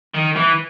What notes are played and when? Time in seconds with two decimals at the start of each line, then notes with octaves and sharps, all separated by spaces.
0.14 D#3
0.36 E3